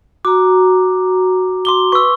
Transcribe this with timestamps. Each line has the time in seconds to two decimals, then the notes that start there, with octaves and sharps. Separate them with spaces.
0.25 F#4 A#5 D6
1.65 C6 D6 G7
1.92 B4 C#6 E6